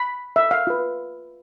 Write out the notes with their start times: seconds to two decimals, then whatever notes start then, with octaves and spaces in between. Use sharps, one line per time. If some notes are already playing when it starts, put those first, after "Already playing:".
Already playing: B5
0.36 E5
0.51 F5
0.67 F4 B4